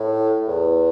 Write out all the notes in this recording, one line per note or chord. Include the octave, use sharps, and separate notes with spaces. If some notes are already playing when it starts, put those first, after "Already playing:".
Already playing: A2
E2